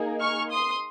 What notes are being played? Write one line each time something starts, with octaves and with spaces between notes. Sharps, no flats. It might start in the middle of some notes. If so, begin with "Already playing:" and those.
Already playing: A#3 D#4 G#4
C#6 F6
C6 D#6